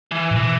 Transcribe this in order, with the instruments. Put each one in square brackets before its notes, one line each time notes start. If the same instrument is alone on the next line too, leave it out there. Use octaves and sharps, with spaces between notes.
[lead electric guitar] E3
[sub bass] A2
[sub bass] B2 [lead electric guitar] E3